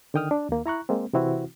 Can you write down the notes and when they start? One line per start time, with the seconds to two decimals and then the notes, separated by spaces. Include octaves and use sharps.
0.14 D3 D#3 G5 D#6 F6
0.31 D4
0.49 D#2 A#3
0.66 E4 A#5 C#6 F#6
0.89 G#3 A#3 C4
1.13 C3 E3 C4 E4 F#4